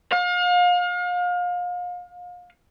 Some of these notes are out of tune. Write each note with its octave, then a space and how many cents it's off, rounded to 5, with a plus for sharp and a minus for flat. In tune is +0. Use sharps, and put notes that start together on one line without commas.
F5 +35